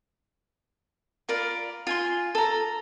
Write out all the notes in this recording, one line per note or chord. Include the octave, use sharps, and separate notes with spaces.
F4 A#4 D5 B5
F4 G#5 C6
A4 A#5